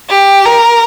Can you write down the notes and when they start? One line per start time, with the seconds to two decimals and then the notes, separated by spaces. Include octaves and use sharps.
0.10 G4
0.45 A#4